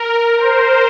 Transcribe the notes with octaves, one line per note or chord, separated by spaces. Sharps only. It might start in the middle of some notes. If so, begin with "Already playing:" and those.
Already playing: A#4
C5